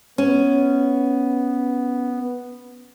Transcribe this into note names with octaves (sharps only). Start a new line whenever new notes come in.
B3 C#4